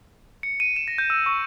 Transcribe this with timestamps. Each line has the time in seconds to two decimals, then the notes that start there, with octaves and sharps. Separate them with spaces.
0.43 C#7
0.60 D#7
0.76 E7
0.88 A#6
0.98 G6
1.10 E6
1.26 C#6